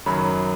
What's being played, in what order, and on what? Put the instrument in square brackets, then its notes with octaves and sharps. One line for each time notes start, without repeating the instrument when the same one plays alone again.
[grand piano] F#2 D#3 F#3 B5